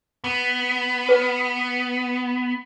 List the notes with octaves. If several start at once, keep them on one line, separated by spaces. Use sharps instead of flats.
B3
B4